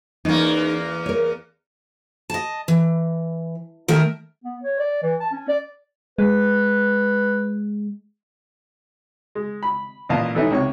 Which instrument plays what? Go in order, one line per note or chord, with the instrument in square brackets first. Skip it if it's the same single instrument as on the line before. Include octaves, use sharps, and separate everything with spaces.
[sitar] E2 A#3 [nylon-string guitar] C#4 D#4
[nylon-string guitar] A#4 C#5
[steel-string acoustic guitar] D#5 A5
E3
D#3 A3 A#4 E5
[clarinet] B3
C#5
D5
E3
A5
C#4
D5
[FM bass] G#3 [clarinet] B4
[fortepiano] G#3
B5
A1 A#2 B3 D#5 F5 A5
E3 A3 B3 C#4 D#4 E4
C#2 C3 C#5 C#6